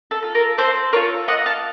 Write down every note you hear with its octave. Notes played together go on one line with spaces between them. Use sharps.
A4
F4 A4
A#4
C4 A4 C5
F4 A4 A#4 C#5
A#3 D#5 F#5
F5 A5